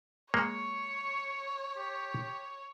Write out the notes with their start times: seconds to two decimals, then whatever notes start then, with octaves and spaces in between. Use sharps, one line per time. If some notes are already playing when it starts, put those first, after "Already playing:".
0.34 G#3 A#3 C#5 C#6
1.76 G4